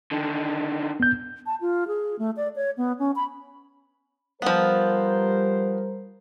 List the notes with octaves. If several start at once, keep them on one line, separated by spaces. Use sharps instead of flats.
D3 D#3
B3 G6
A5
F4
G#4
A3
D5
C#5
B3
C#4
B5
F3 G3 B3 A#4 C5